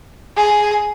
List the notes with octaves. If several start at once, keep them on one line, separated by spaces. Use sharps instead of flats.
G#4